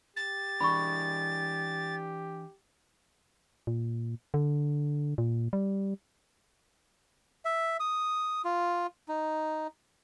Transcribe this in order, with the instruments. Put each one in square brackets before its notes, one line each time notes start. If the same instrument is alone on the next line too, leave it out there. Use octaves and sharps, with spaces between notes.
[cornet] G4 [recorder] A6
[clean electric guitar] E3 D4 [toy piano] B5 C#6
[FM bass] A#2
D3
A#2
G3
[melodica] E5
D#6
F4
D#4